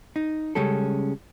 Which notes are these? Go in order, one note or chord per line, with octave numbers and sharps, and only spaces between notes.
D#4
C#3 G3 G#3 C#4 A4